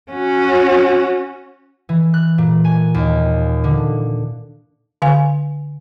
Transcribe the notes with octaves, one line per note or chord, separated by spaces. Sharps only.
C#4 F#4
E3
F#6
A#2
G#5
D#2
D3
D3 F5 G#5